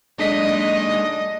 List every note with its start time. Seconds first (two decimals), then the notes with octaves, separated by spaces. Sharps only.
0.19 G#3 D4 D#4 A4 D#5 B6